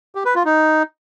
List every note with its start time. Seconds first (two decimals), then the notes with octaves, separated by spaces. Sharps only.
0.15 G4
0.25 B4
0.35 F4
0.45 D#4